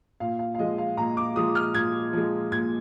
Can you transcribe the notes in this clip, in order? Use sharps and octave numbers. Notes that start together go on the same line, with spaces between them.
A#2 F5
F5
F5
F3 G#3 D#5
F5
A#2 A#5
D6
F3 G#3 D#6
F6
A#2 G#6
F3 G#3
A#2 G#6